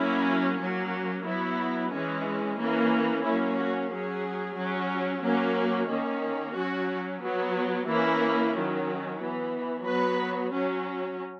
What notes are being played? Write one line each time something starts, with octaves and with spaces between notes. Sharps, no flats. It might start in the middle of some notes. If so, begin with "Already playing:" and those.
Already playing: F#3 A#3 C#4 E4
F#3 A#3 C#4
F#3 B3 E4
E3 G#3 C#4
E3 A#3 C#4
F#3 A#3 C#4 E4
F#4
F#3 C#4 G#4
F#3 C#4
F#3 A#3 C#4
D#3 A#3 C#4
F#3 C#4 F#4
F#3 B3
E3 A#3 C#4 E4
D#3 F#3 C#4
E3 B3
F#3 B3 B4
F#3 C#4